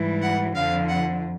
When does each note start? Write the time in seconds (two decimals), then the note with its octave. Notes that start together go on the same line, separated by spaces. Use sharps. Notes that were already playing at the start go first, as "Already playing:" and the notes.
Already playing: G#2 E3 G3
0.21 F#5
0.54 F2 D3 F3 F5
0.88 F#5